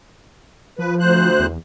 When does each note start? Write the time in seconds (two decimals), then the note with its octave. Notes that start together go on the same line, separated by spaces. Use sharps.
0.79 F3 B4
1.00 D2 C5 F#6
1.39 E2